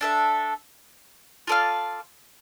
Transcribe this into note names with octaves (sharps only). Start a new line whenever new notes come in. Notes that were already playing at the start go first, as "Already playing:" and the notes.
D4 A4 E5
F4 A4 D5 F5